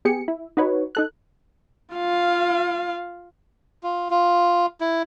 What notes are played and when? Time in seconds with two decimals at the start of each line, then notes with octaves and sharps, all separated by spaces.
0.05 B3 G4 G#4 C#7
0.28 E4
0.57 D#4 F#4 B4 C#5
0.95 D#4 A4 F#6
1.95 F4 F5
3.83 F4
4.10 F4
4.81 E4